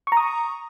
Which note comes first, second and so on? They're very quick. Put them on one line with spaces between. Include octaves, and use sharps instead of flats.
C#6 A#5 D#6